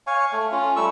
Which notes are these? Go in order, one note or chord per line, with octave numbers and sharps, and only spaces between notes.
C#5 F5 G#5 C#6
A3
C#4 F4
G3 A3 C#6 E6